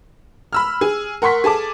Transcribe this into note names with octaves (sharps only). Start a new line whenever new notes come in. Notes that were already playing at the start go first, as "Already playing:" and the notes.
B5 E6 F6
G#4
A#4 F#5 C6 C#6 B6
G#4 A4 A5 D6